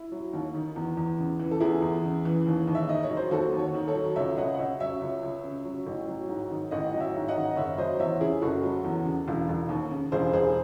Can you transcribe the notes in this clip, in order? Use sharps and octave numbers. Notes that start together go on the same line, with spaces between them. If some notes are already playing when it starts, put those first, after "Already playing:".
Already playing: E4
F#3
D#2
D#3
E2
E2
C#3
E3
A4
E2 E4 G#4
E2
C#3
E3
D#2
D#2
E5
D#3 D#5
C#5
F#3
C5
D#2 F#4 A4
D#2
A4 C#5
D#3
A4 C#5
F#3
C#2 C#5 E5
C#2 D#5 F#5
F#5
C#3 C#5 E5
F#3 C#5 E5
C#2
C#2
C#3
F#3
A1
F#3
G#2
D#3
A1 D#5 F#5
F#3
C#5 E5
G#2
D#5 F#5
D#3
F#1 C#5 E5
F#3 C5 D#5
E2 C#5 E5
C#3 E4 G#4
F#1 F#4 A4
F#3
E2
C#3
E1
E1
D#2
C#3
E1 G#4 C5
E1 G#4 C5